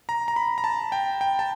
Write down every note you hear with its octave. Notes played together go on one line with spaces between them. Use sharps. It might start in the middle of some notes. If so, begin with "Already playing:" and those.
A#5
A#5
B5
A#5
A5
G5
G5
A5